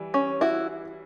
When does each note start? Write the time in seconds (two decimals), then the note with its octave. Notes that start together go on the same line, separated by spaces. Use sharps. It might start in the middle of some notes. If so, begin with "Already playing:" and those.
Already playing: E3 G3
0.14 C#4
0.41 E4 F#4